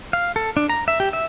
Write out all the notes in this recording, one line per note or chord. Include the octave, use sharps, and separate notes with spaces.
F5
A4
D4
A#5
E5
G4
E5